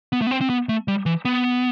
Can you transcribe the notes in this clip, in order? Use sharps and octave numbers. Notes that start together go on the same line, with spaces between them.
B3
A3
B3
C4
C4
B3
A3
G3
E3
B3